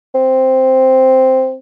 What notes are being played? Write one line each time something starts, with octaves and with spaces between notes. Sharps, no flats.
C4